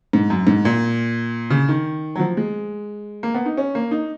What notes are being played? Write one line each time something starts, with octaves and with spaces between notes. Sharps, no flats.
G#2
F#2
G#2
A#2
C#3
D#3
F#3
F3
G#3
A#3
B3
D#4
C#4
A#3
D#4